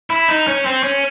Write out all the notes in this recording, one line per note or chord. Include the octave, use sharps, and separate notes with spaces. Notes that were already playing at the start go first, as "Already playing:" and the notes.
E4
D#4
C#4
C4
C#4